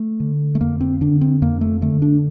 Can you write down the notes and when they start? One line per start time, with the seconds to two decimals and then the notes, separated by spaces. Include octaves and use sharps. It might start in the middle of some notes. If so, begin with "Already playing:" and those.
Already playing: A3
0.20 D3
0.55 A3
0.61 F2 A#3
0.81 C4
1.01 D3 D4
1.21 C4
1.42 F2 A#3
1.61 A3
1.82 D3 A3
2.02 D4